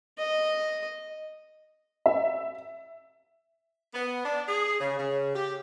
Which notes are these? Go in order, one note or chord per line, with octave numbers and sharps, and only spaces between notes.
D#5
E5
B3
D4
G#4
C#3
C#3
G4